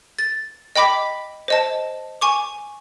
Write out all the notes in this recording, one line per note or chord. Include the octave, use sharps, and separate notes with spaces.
A6
D#5 G5 B5 D6 B6
C5 D#5 A5
G#5 C#6 D6